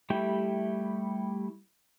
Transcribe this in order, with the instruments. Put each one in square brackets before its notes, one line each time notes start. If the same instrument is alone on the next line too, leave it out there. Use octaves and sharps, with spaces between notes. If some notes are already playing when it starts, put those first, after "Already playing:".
[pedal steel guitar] G3 A3 E4 G4 G5